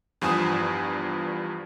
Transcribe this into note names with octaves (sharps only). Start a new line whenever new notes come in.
E2 G2 F3 G#5 D#6 E7